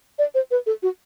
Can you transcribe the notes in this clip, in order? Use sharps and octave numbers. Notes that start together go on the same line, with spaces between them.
D5
C5
B4
A4
F#4